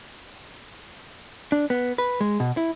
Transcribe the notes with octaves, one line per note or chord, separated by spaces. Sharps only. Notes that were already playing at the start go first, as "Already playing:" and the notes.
D4
B3
B4
G#3
B2
E4